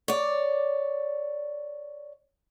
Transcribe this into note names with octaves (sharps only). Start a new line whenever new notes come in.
C#5 D5